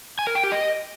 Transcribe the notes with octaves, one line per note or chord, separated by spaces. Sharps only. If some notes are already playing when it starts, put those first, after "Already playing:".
G#5
A#4
G5
G4
D#5